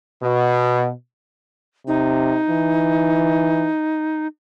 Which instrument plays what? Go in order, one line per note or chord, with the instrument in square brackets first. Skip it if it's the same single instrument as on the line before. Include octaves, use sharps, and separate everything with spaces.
[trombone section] B2
[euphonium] C3 [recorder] D#4
[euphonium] E3